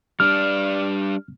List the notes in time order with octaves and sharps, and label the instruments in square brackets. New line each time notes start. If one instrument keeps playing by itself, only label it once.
[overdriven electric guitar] G3 D4 [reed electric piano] F6